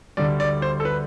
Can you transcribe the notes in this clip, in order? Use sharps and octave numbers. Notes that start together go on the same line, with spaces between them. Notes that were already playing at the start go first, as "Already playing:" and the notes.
D2 D3 G3 D5
D5
C5
A4
B4